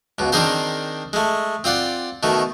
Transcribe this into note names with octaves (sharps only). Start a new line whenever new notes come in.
C#2 B2
D#3 C4 D4 G#4 A#4 C5
G#3 A3
C4 F4 D5 F#5
B2 D#3 A3